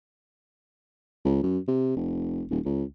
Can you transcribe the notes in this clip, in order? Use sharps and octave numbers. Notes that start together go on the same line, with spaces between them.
C#2
F#2
C3
F1
D#1
C#2